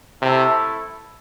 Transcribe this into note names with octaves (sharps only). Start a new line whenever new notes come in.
C3 A3 E4 A4